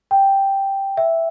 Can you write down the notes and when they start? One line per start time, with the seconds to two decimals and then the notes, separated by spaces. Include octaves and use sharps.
0.11 G5
0.97 E5